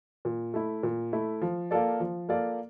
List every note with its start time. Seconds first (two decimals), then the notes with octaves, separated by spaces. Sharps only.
0.25 A#2
0.54 A3 E4
0.83 A#2
1.13 A3 E4
1.41 F3
1.71 A#3 F4 A4 D5
2.00 F3
2.29 A#3 F4 A4 D5